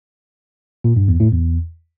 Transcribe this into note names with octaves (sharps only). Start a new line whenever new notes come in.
A#2
G2
E2
A2
E2